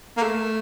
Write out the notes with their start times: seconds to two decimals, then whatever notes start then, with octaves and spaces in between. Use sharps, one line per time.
0.17 A#3
0.22 A3